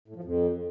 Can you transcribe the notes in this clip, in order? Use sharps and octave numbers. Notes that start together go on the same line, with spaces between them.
A2
F3
F2